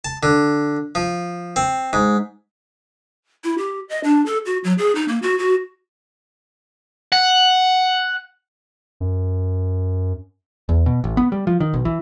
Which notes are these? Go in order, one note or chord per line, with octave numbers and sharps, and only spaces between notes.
A5
D3
F3
C4
G#2
E4
G4
D#5
D4
A4
F#4
F#3
G#4
D#4
A#3
F#4
F#4
F#5
F#2
E2
B2
A1
B3
G3
F3
D#3
B1
E3